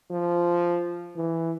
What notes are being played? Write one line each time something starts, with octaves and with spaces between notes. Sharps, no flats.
F3
E3